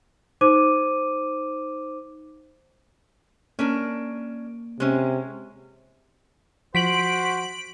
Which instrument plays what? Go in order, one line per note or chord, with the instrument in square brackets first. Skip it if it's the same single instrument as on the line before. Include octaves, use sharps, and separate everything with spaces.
[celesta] D#4 C5 D6 D#7
[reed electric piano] A#3 [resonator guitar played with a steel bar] C#4 D4 A#4
[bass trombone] C3 [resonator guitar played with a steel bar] G#3 C#4
[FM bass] F3 [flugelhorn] F#4 [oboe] C5 [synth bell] B6 D7 F#7